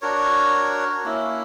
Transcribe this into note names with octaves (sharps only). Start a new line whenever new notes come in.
D4 F#4 A#4 C#5
A#3 C#4 E4